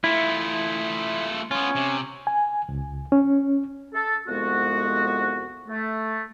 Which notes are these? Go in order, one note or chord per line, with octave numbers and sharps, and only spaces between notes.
A3 E4 F4
B3 C#4 F4
C3
G#5
C#2
C#4
A4
C2 F2 G#3 B3 F#4
A3